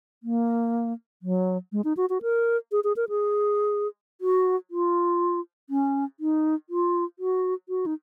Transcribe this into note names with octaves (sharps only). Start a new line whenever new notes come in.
A#3
F#3
G#3
D#4
F#4
F#4
A#4
G#4
G#4
A#4
G#4
F#4
F4
C#4
D#4
F4
F#4
F#4
D#4